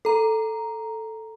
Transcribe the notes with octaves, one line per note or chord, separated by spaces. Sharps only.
A4 A#5